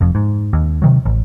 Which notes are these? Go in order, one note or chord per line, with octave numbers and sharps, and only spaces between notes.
F1 F2
G#2
D#2
C3 D#3 F#3
A1